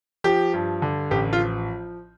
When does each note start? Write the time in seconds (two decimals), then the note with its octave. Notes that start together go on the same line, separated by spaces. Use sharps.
0.24 F3 G4
0.53 G2
0.82 D3
1.11 A1 G4
1.33 F4
1.40 F3